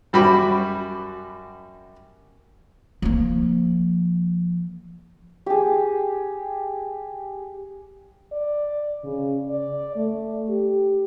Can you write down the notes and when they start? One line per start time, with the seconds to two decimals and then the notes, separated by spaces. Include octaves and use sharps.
0.13 F#2 G3 F#4 B5 D6
3.02 F3 A#3
5.46 G4 G#4
8.32 D5
9.04 C#3
9.50 D5
9.96 A3
10.49 G4